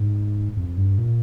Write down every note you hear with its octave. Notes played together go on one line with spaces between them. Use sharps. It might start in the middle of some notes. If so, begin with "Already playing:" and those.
Already playing: G#2
F2
G2
A#2